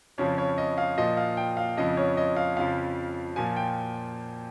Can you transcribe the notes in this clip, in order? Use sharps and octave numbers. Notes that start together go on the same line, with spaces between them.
F2 C#3 F3 C#5
C#5
D#5
F5
A#2 F3 D#5
F5
G5
F5
F2 C#3 F3 D#5
C#5
D#5
F5
F2 C#3 F3 F5
A#2 F3 G#5
G5